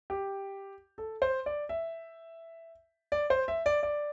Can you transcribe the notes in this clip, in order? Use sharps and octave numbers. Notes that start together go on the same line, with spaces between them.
G4
A4
C5
D5
E5
D5
C5
E5
D5
D5